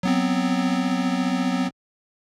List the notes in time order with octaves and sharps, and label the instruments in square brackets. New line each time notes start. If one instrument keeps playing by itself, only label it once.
[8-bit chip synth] F#3 B3 C4